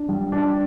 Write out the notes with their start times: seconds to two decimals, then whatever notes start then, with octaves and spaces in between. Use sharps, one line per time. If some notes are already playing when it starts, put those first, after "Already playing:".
Already playing: D4
0.09 G3
0.32 D4